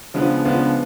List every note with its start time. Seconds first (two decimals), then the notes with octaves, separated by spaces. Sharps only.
0.14 C#3 F3 G#3 B3 D4
0.45 C#3 F3 G#3 B3 D4